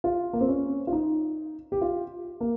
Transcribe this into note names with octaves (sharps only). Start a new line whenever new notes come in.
F4
A#3
C4
C#4
F4
D#4
G4
F4
A#3